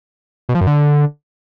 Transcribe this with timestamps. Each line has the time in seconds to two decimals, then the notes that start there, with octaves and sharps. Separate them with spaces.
0.49 B2
0.55 F3
0.61 F#2
0.67 D3